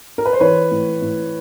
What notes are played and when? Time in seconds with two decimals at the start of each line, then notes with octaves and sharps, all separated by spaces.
0.18 A#4
0.25 B4
0.33 C5
0.40 E3 B4 C#5
0.71 A2
1.02 A2